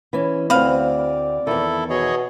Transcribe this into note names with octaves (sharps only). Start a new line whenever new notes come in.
E3 C#4
D2 C4 B4 D5 F5
E2 D#3 E4 A4
B2 G#4 C#5 D#5